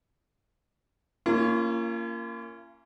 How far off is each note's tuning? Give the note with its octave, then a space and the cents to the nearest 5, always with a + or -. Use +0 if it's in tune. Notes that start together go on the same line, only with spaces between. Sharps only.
A#3 -15 C#4 +0 F4 -40